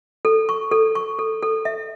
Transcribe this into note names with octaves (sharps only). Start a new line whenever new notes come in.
A4
C#6
A4
C#6
A4
A4
E5